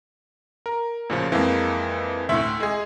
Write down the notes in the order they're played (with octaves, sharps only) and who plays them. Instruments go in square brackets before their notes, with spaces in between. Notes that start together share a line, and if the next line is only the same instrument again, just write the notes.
[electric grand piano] A#4
[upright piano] A1 [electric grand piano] A#2 C#3 F3
[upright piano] F2 A#3 [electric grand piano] E3 G#3
[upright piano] D2 A2 [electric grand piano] E5
[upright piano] G#3 G#4